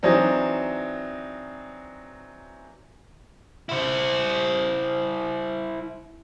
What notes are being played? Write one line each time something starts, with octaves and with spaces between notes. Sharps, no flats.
E3 F#3 C4 D4 D#4
E4 C5